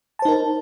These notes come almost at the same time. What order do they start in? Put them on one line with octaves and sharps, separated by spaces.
A5 C5 D#4 A#4